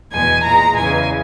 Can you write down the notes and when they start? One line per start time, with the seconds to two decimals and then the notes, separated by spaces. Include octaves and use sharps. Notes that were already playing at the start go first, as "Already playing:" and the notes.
0.12 E2 B2 G#3 G#5
0.43 A#2 G#3 A#5
0.76 E2 C#3 E3 G#3 G#5